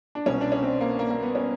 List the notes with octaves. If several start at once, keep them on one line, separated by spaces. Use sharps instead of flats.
D4
C2 B2 C#4
D4
C#4
C4
A#3
A#3
A#3
B3
C#4